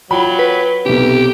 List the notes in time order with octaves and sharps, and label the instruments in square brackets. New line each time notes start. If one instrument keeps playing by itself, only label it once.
[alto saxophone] F#3 [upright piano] F4 G5 B5
[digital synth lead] B4
[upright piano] B1 C3 [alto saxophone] G4